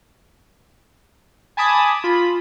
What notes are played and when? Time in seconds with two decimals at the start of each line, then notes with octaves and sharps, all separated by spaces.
1.57 G#5 A5 B5 D6 D#6 G#6
2.04 F4 B5